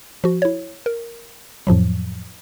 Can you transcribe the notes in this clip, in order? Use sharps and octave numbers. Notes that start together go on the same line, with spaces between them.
F3 F#4
E4 C#5
A#4
F2 A2 F3 F#3